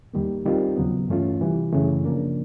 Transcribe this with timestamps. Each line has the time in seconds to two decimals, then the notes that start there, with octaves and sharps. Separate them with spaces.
0.14 D#2 D#3 G3 A#3
0.46 D#3 G3 C4 F4
0.77 D#2 C#3 F#3 B3
1.08 G2 E3 A3 C#4 F4
1.41 C3 E3 G3
1.72 F#2 C#3 E3 A3
2.04 C#3 F3 A#3 D4